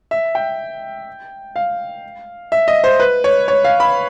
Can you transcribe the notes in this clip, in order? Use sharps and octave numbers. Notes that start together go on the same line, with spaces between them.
E5
G5
F5
E5
D#5
C5
B4
C#5
C#5
F5
B5